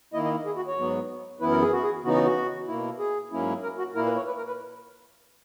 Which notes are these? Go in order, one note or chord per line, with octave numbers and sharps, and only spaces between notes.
D#3 A#3 E4 D#5
D#5
G#4
F#4
C#5
G#2 F#3 B3
F#2 E3 B3 E4 B4
A#4
G#4
F#4
G#4
C#3 E3 B3 D#4 F#4
F#4
F#4
B2 A#3 E4
G#4
G#2 F#3 A#3 C#4 E4
A#4
F#4
A#2 A#3 E4 A#4
B4
C#5
B4
A#4
B4